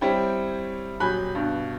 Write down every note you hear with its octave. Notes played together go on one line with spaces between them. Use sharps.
G3 C4 E4 C#5 G5
D#1 F#3 G#5 B5 F#6 G6
G2 B2